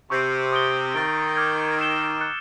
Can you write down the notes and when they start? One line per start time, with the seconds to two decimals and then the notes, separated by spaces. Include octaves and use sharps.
0.10 C3 C#6 E6 G6 C7
0.53 D#6 G6 A#6 D7 G7
0.94 D#3 A6 D7 G7
1.36 D6 F6 G#6
1.79 E6 G#6 C7 E7 G7
2.20 F#6 A6 C#7